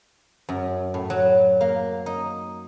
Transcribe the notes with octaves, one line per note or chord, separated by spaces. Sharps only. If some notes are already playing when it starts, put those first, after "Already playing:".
F#2
A2
F#3
A#3
D#4